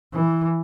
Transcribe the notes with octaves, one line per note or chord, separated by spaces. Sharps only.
E3